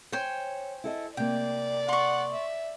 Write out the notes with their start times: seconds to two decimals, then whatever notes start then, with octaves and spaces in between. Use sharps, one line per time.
0.12 C5 C#5 G5 G#5
0.84 E4 A4 D#5
1.17 C3 A#3 D5 G5
1.89 F#5 C6 C#6
2.32 E5